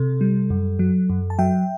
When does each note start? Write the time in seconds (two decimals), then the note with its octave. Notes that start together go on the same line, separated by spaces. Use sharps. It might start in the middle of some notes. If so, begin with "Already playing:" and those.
Already playing: C3 A4
0.21 G3
0.50 F#2
0.79 F#3
1.10 F#2
1.30 A5
1.39 F#3 E5 G5